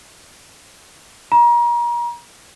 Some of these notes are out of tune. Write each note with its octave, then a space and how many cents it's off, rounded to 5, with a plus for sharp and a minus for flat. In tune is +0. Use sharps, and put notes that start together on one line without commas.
A#5 +35